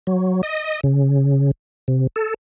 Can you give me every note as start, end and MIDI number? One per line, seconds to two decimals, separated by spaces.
0.07 0.42 54
0.43 0.80 75
0.84 1.51 49
1.88 2.07 48
2.16 2.34 69